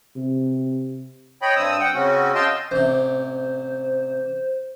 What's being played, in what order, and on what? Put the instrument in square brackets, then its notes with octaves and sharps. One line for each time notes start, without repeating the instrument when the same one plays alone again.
[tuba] C3
[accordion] C#5 D#5 G5 B5
G2 C4 D#6 E6
F#5 G5
C#3 C4 C#4 F#4
D#5 F5 G5 A5 C6 E6
[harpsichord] A1 C3 [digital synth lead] C5